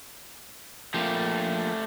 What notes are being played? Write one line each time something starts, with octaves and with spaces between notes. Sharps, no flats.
F3 A3 A#3 G4